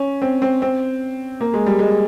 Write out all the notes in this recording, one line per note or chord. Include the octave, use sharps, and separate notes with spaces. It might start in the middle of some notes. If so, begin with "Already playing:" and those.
Already playing: C#4
C4
C4
C4
A#3
G#3
G3
G#3